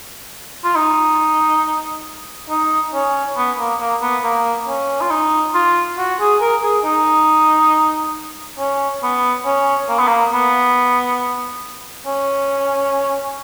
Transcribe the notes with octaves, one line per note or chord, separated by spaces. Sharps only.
F4
D#4
D#4
C#4
B3
A#3
A#3
B3
A#3
C#4
F4
D#4
F4
F#4
G#4
A#4
G#4
D#4
C#4
B3
C#4
A#3
B3
A#3
B3
C#4